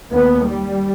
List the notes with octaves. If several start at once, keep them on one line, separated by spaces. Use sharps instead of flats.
D#2 B3
G3